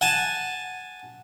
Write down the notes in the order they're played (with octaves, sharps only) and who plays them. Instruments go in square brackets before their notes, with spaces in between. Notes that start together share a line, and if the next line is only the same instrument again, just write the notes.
[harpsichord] F#5 G#5 A5